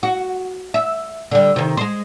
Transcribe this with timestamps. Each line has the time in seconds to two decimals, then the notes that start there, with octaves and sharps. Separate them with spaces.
0.03 F#4
0.74 E5
1.31 D3 G3
1.56 C3 D#3
1.77 G#3 C5